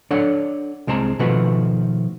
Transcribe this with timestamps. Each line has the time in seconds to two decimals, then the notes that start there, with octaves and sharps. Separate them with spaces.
0.11 D4 A4 C#5 F#5
0.87 C2 G#3 C4 A5 A#5
1.19 B2 D#3 F3 A3 F#4 B4